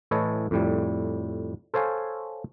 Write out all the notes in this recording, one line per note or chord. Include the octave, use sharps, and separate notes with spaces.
A2 E3 E4 A4 C#5 D#5
F2 A2 G3
A4 C5 C#5 F5 G#5